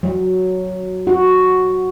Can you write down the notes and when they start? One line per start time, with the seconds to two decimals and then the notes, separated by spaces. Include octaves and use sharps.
0.03 F#3
1.07 F#4